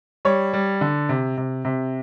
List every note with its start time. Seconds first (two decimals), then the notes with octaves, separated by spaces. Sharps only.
0.25 G3 C#5
0.53 G3
0.81 D3
1.09 C3
1.38 C3
1.65 C3